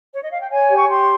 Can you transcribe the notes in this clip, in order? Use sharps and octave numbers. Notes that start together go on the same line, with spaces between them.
C#5
D#5
F5
G5
C#5 G#5
G4
C#6
G4 C6